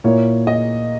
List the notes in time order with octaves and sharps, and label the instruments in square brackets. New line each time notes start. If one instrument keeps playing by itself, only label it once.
[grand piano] A#2 A#3 E4 C#5
D#5